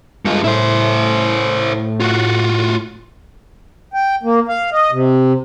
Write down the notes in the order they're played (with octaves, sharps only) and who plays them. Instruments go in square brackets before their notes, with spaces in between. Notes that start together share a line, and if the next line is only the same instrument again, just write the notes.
[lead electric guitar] G2 F4 [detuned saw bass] G#3
[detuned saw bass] A2 [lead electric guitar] E4 C5
[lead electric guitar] F4 F#4
[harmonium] G5
A#3
F5
D#5
C3